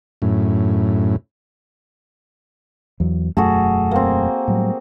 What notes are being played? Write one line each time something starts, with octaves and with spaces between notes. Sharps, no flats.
F#2 A2
E2 F#3
E1 F#2 A3 F#4 G#4 A4
A#3 C4
A2 F#3 G3